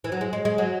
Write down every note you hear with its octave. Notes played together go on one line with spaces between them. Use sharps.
E3
F#3
G#3
G#3
G#3
F#3